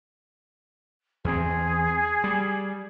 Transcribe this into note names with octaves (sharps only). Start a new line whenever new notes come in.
E2 C4 G#4
G3